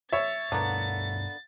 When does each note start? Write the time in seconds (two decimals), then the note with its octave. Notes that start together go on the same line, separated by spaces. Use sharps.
0.12 C#5 E5 A6
0.52 G2 B2 D3 A#3 B3